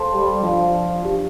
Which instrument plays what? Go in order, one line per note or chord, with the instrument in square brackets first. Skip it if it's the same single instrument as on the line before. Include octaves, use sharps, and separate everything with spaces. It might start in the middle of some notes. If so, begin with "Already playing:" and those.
Already playing: [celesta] A4 C5 F5 A5 C6
[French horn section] G3
[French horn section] F3 [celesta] D4 F4 D5 F5
[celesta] D4 G4 F5